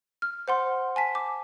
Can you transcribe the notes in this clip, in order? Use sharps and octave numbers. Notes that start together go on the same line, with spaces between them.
F6
C5 F#5 C6
G#5 A5 B6
D6